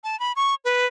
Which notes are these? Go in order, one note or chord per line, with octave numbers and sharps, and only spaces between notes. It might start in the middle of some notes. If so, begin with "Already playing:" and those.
A5
B5
C#6
B4